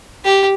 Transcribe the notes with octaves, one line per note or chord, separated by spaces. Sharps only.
G4